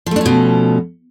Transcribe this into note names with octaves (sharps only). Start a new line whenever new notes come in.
B2 F3 A3 C#4 D4